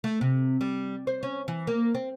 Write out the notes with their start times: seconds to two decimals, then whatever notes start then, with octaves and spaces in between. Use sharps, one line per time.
0.04 A3
0.21 C3
0.61 G3
1.07 C5
1.23 C#4
1.48 E3
1.67 A#3
1.95 C4